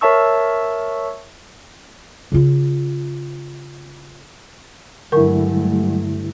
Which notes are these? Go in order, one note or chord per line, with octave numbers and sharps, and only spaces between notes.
A#4 C#5 E5 A5 C#6 E6
C#3 F4
G2 D3 F#3 G#3 A3 E4 A#4 C#6